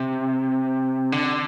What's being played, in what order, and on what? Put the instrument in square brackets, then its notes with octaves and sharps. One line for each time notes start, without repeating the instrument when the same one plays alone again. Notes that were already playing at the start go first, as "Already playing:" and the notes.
Already playing: [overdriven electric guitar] C3
D3